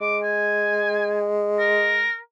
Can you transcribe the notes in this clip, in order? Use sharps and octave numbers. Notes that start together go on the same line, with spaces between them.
G#3 D6
G#5
A#4